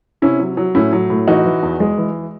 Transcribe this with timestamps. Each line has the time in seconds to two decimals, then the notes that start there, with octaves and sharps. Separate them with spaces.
0.22 C3 C#4 E4
0.40 F#3
0.57 F#3
0.75 A2 C#4 E4
0.93 F#3
1.10 A2
1.28 E3 D#4 F#4
1.45 E3
1.63 E2
1.80 G#3
1.98 E3